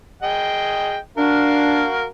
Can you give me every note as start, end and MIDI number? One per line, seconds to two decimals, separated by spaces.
0.23 0.97 68
0.23 0.97 75
0.23 0.97 79
1.18 1.86 62
1.18 2.06 66
1.18 2.06 70
1.18 2.06 77